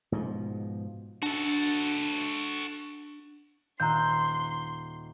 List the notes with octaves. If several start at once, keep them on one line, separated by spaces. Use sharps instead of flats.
G#2 B2 F3
D4 F#4 A4
D#1 A#5 C6 E6 F#6 G6